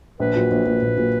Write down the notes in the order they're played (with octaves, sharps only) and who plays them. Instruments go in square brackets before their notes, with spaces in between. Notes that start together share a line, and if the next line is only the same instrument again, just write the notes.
[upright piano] A#1 [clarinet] B4
[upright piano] A#2 F#3
A#1
A#2 F#3
A#1
A#2 F#3